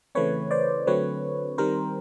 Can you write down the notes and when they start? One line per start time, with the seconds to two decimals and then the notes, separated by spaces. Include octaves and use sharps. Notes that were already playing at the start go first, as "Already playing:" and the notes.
0.15 C#3 E3 A3 C4 B4 C#5
0.51 C5 D5
0.87 D3 F#3 A3 C4 B4 C#5
1.58 D#3 G3 C4 A#4 C5